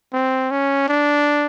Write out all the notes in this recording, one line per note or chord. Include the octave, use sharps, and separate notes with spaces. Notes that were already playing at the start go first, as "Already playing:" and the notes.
C4
C#4
D4